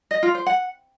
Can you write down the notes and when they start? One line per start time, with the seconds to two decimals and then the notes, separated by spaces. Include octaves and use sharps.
0.11 D#5
0.23 F4
0.35 C5
0.46 F#5